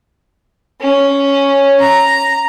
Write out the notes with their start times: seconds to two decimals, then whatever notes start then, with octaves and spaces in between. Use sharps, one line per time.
0.81 C#4
1.80 A#5